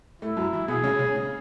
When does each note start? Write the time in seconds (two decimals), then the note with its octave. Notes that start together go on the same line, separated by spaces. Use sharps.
0.22 A2 A3 E4
0.37 F#2 F#3
0.53 E3
0.68 B2 B3 G#4
0.83 C#3 C#4
0.99 C#3 C#4
1.14 C#3 C#4